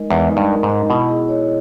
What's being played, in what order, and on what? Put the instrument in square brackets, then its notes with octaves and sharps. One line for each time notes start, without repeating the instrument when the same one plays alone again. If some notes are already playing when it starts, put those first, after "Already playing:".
Already playing: [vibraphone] G#3 D#4 A#4 D#5
[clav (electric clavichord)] E2 [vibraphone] G#3
[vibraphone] D#4
[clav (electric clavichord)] G2
[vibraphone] A#4
[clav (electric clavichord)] G#2
[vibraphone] D#5
[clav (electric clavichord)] B2 [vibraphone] E4
[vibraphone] G#4
C#5